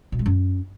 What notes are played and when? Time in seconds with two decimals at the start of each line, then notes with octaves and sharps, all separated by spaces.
0.12 B2
0.19 G#3
0.26 F#2